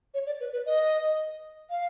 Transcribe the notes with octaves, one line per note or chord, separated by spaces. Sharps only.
C#5
D5
B4
B4
D#5
F5